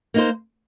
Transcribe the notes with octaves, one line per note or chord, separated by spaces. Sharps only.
A#3 D#4 C5